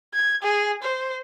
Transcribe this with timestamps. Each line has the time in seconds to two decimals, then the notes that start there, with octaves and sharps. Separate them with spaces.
0.14 G#6
0.43 G#4
0.82 C5